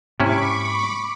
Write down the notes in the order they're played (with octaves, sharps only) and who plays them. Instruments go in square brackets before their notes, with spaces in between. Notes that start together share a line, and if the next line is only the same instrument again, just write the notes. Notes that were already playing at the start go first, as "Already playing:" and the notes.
[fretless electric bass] G#2 A#3 [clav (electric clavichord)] C3 C#4 E4 [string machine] B5 C#6 D6